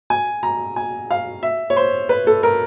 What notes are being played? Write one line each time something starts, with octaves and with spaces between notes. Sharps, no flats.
G#5
A#5
G#5
F5
E5
C#5
C5
B4
A4
A#4